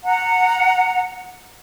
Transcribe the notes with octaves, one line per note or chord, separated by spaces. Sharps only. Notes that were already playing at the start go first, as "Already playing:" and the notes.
F#5 A#5